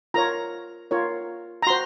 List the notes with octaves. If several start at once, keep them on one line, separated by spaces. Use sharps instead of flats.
F4 A#4 C#5 A#5
F4 A#4 C#5
A#5
F#4 C5 C6